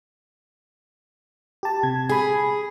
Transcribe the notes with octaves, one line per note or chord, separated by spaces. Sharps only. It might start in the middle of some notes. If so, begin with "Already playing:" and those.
G4 A5
C3 G#6
G#4 G#5 B5